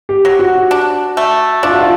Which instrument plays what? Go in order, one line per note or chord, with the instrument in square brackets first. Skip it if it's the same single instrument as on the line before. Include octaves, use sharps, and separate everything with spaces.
[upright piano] G4
[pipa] F#3
[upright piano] F#4
[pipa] D4
A3
[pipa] D4 [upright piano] F4
[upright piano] F#4
F4